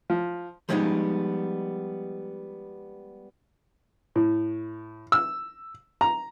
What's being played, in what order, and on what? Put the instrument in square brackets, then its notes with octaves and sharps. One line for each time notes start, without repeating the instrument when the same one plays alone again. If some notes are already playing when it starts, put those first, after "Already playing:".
[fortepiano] F3
[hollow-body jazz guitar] F3 G3 G#3 B3 C#4 D#4
[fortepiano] A2
E6
A#5